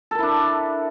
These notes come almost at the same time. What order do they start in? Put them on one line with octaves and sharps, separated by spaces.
A4 A#4 E4 D4